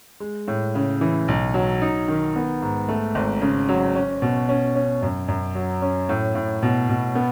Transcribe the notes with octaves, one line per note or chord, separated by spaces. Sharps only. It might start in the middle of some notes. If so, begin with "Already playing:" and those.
G#3
A2
C#3
E3
B1
F#3
D#4
D#3
B3
G#2
A3
G#1
C#3
F#3
C#4
B2
C#4
C#4
F#2
F#2
F#3
C#4
A2
A2
B2
B2
B3